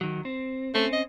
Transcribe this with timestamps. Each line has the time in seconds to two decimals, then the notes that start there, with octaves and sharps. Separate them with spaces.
0.01 D#3 F#3
0.25 C4
0.75 A3 C4 C#4
0.93 D#5